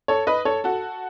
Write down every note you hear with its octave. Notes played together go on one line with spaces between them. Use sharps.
A4 C#5
B4 D#5
A4 C#5
F#4 A4